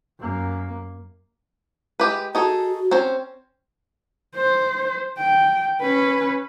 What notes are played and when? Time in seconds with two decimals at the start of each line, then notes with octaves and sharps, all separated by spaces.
0.20 F#2 A#3
2.00 G#3 G4 B4
2.35 D#4 F#4 G#4 A4
2.91 C4 C#4 C5
4.36 C5
5.18 G5
5.81 C#4 B4